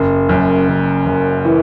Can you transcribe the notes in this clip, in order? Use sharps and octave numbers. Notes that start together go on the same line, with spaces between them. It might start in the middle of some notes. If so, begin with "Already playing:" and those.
Already playing: F#1
F#2
F#1
F#1
E3